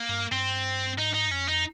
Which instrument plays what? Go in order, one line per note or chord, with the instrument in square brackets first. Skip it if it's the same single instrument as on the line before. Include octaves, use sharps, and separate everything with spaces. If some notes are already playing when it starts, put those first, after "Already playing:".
Already playing: [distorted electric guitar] A#3
[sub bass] G2
[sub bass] G2 [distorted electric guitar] C4
[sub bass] G#2 [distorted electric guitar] D#4
[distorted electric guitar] D#4
[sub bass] G2
[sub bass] F2 [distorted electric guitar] C#4
[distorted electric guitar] D#4